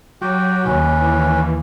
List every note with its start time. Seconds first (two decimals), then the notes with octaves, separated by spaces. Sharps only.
0.21 F#3 F#4 G4 G5
0.65 D#2 C#4 B4
1.01 E3